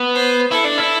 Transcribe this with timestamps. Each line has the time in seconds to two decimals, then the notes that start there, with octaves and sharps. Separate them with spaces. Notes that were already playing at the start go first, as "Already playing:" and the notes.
Already playing: B3
0.15 C5
0.51 E4 A4
0.64 D4
0.78 E4